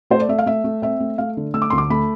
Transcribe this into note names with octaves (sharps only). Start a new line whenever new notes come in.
A3 C5
D5
A3 E5
F5
A3 E5
A3
C4 E5
A3
A3 F5
D3
A3 E6
D6
D2 C6
D6
A3 B5